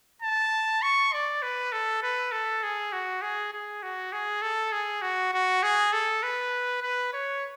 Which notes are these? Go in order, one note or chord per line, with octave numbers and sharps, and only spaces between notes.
A5
C#6
D5
B4
A4
B4
A4
G#4
F#4
G#4
G#4
F#4
G#4
A4
G#4
F#4
F#4
G#4
A4
B4
B4
C#5